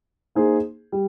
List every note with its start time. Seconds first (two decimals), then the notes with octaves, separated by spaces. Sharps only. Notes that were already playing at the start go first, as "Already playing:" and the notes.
0.35 A#3 D#4 G#4 C5
0.92 G3